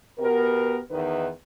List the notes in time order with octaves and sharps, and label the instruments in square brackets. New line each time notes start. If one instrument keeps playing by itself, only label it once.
[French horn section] B2 B3 G4 A#4
E2 D#3 B4